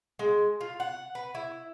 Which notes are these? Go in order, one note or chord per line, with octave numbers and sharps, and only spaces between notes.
G#3
F4
F#5
B4
E4